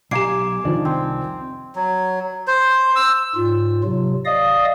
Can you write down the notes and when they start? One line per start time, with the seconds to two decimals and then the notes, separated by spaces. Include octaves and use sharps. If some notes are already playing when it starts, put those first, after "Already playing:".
0.11 B1 G4 F5 G#5 A#5 D6 C7
0.65 C2 D#3 F3 D4
0.85 C4
1.76 F#3
2.47 C5
2.96 E6
3.35 G#2 F4
3.84 C3 F#3
4.25 D5 D#5 F5 D#6